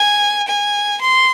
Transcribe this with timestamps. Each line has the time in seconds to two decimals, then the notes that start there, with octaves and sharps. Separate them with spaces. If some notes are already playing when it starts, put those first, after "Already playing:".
Already playing: G#5
0.48 G#5
1.01 C6